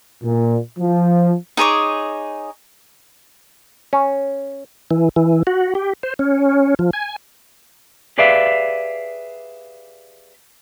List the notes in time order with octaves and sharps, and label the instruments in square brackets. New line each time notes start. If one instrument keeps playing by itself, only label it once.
[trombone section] A#2
F3
[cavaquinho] D#4 G#4 C#5 D6
[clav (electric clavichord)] C#4
[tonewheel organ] E3
E3
F#4
G4
C5
C#4
F3
G#5
[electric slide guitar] G4 G#4 B4 D5 E5 F5